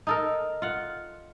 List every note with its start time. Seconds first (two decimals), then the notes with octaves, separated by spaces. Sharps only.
0.07 D#4 A4 A#4
0.62 F4 F#5